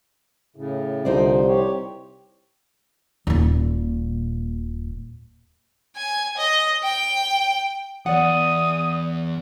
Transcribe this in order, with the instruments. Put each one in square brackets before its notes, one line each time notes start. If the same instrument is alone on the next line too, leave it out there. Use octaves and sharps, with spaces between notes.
[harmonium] A2 C#3
[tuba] C2 [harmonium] D3 F3 [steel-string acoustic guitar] D#4 C5 D5
[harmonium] G4 C#5
[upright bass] D#1 A#2
[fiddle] G#5
D#5
G5
[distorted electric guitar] E2 [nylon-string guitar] D5 F#5 [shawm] D#6